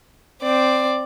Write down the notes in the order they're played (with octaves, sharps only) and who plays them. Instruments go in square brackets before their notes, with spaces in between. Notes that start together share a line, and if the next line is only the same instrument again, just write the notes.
[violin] C4 D5